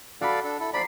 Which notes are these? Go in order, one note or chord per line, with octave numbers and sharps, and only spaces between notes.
F#4 A4 D5 F5 B5
D4 A4
E4 A4
F3 D5 A#5 B5 B6 C7